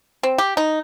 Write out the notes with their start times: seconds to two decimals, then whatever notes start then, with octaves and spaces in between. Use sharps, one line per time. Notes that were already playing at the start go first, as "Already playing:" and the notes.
0.23 C4
0.38 G4
0.57 D#4